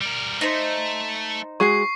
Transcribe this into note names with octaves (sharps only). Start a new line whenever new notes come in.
G3 A#4
A3 D#4 C5
G#3 F#4 G#4 C#6 C7